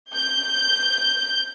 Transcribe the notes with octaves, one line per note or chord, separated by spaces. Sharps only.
G6